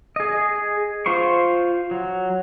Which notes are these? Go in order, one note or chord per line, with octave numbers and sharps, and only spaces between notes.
G#4 D#5
F4 C5 C6 C#6
F#3